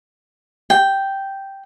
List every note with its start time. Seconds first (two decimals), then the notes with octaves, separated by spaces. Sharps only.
0.70 G5